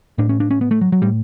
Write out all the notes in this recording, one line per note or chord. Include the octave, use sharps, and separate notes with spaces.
A2 D4
C#4
D4
C#4
B3
A3
F#3
F#3
A2 G3